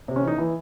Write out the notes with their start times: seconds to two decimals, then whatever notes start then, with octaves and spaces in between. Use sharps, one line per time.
0.08 C3
0.16 C#4
0.23 E3 D#4
0.38 E3